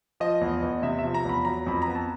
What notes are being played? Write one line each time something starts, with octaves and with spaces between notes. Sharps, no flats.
F3 D#5
E2
E2
C3 E5
E5
F3
A#5
E2 B5
F#3 A#5
F2 B5
A#5
B3
A5